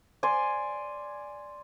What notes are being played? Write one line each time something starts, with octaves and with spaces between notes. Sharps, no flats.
D5 G#5 C6